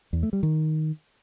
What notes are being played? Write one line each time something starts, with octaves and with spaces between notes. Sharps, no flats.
E2
A3
G3
D#3